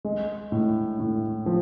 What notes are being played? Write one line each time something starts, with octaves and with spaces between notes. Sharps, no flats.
G#3
A2
A2
F3